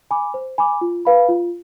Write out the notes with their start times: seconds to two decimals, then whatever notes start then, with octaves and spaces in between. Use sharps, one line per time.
0.11 G#5 B5 D6
0.34 C5
0.58 G#5 B5 D6
0.81 F4
1.05 B4 F5 B5
1.29 F4